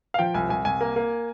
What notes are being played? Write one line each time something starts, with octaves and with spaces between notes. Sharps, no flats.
F5
F3 G5
C2 G#5
C2 G#5
C2 G#5
A#3
A#3